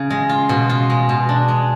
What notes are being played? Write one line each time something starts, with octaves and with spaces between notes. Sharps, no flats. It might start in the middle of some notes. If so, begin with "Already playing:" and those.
Already playing: C#3
G#3
F4
B2
F4
G#3
B2
D4
G#3